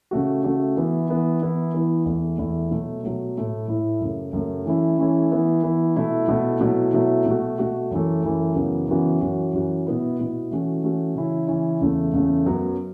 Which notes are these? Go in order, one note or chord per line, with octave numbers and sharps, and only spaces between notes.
C#3 A3 F#4
C#3 A3 F#4
E3 B3 E4
E3 B3 E4
E3 B3 E4
E3 B3 E4
E2 E3 A3 E4
E2 E3 A3 E4
B2 F#3 A3
B2 F#3 A3
A2 A3 E4
A2 A3 E4
F#2 C#3 A3
F#2 C#3 A3
E3 A3 C#4 E4
E3 A3 C#4 E4
E3 B3 E4
E3 B3 E4
B2 A3 E4
B2 A3 E4
B2 F#3 A3 E4
B2 F#3 A3 E4
B2 A3 F#4
B2 A3 F#4
F#2 E3 A3
F#2 E3 A3
F#2 C#3 E3 B3 F#4
F#2 C#3 E3 B3 F#4
F#2 E3 C#4 F#4
F#2 E3 C#4 F#4
B2 B3 E4
B2 B3 E4
E3 A3 C#4 F#4
E3 A3 C#4 F#4
C#3 E3 C#4 E4
C#3 E3 C#4 E4
E2 C#3 A3
E2 C#3 A3
F#2 F#3 B3